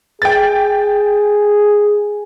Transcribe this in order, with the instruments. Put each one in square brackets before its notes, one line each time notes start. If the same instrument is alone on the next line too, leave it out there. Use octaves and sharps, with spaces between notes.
[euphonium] G#4 [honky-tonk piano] G5 A6